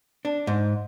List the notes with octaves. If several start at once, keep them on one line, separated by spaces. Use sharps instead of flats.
D4
G#2